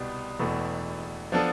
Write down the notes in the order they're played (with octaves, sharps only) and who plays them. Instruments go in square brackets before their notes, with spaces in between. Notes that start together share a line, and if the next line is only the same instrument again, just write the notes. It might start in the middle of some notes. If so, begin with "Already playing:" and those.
Already playing: [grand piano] C2 B2 G3 B3
E1 E2 B2 A3
F3 B3 D4 A4